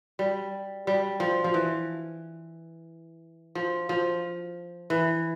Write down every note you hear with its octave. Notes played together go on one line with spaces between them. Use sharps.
G3
G3
F3
F3
E3
F3
F3
E3